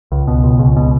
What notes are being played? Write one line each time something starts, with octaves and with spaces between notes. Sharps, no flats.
C#2
B2
C#2
C#2
B2